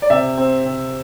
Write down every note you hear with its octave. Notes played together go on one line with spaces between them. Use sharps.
D5
C3 E5
C4
C3